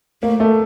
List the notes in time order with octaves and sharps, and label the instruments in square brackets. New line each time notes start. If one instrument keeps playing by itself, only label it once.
[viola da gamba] A3 [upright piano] A#3
[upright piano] A3